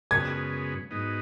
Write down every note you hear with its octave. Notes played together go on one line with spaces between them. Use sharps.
F#2 C#3 G#3 B3 G#6
G#2 F#3 B3 D#4